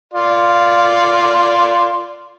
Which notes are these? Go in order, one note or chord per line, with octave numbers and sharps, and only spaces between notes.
F4 D5 C6